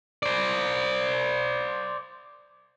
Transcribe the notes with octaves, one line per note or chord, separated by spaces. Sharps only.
C5 D5